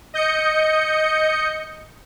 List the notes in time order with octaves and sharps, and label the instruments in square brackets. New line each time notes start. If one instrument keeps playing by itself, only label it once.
[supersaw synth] D#5 G6 C#7